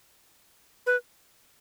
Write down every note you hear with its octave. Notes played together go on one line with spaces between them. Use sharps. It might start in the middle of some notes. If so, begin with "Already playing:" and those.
B4